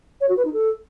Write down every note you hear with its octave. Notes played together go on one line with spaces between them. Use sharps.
C#5
F#4
B4
D#4
A4